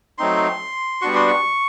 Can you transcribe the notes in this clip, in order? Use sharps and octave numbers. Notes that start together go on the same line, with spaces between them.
F#3 A3 C4 D#4 C6
G3 B3 D4 F#4 C#6
C6
C#6